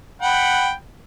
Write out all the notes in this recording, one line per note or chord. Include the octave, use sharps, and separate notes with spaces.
F#5 G5 B5